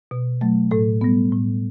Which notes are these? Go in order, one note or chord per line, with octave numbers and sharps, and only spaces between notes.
B2
F#3 A3
A2 A4
G3 B3
A2